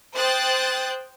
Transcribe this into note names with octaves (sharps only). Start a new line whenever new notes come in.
C5 G5 D#6 F#6 G6 A6